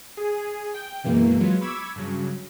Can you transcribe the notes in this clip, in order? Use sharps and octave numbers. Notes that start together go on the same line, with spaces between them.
G#4
G5
F#2 B2 E3 G#3 A#3
F#3 G#3 B3 F4
B5 C#6 D6 E6 G#6
G2 C#3 F#3